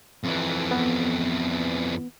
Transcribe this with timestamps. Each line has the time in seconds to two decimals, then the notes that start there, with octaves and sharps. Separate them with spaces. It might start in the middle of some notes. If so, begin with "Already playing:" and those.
0.24 F2 E3
0.71 B3